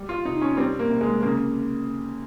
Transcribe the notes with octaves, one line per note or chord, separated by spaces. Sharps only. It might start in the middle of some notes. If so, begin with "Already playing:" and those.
Already playing: G3
F4
C3 D#4
C#4
G3 C4
A#3
C3
G#3
C#3 A#3